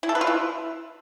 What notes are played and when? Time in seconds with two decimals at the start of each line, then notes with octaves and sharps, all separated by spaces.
0.03 E4
0.09 A4
0.15 B4
0.21 F4
0.27 E4